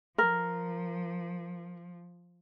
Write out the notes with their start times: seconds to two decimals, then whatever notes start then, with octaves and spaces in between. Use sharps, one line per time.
0.18 F3 A#4